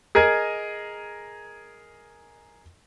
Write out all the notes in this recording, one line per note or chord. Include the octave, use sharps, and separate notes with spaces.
G#4 A#4 D#5 G#6